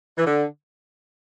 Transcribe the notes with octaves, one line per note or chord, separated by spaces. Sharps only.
E3
D3